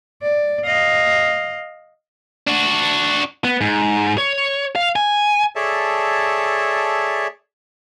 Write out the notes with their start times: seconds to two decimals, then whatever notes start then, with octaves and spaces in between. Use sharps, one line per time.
0.23 D5
0.65 D#5 F5
2.47 D4 F#4
3.44 B3
3.61 G#2
4.18 C#5
4.76 F5
4.96 G#5
5.56 G#4 A4 C#5 D5 E5 A5